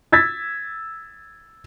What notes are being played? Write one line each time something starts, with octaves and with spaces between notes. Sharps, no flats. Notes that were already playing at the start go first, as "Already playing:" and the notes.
E6 G#6 A6 B6